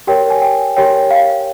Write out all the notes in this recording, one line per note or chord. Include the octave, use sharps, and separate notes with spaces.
G4 A#4 C#5 G5
G#5
G5
G4 A#4 C#5 G5
F5